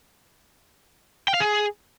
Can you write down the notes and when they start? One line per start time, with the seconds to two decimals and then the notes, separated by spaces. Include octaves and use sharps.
1.28 G5
1.34 F5
1.40 G#4